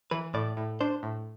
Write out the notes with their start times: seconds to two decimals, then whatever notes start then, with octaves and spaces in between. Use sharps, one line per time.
0.11 E3 B4
0.34 A2 D5
0.57 A2
0.80 D4 C5
1.03 A2